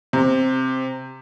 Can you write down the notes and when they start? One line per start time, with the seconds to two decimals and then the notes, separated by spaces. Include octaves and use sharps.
0.13 C3